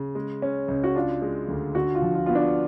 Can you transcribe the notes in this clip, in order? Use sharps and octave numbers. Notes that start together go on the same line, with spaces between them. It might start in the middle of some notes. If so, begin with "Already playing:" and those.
Already playing: C#3
G#3
C#4
C#2
F#4
D4 F4
G#3
D2
D3 F#4
F4
F3
F4
B3 F4
D4